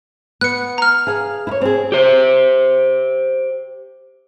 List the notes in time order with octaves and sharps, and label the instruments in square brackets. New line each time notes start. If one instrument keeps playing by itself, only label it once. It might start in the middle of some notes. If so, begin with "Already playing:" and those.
[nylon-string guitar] B3 [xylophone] F#6 C#7
[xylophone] A#5 F6
[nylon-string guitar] G#4 F5
E4 C#5
C4 G#4
[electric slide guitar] G4 C5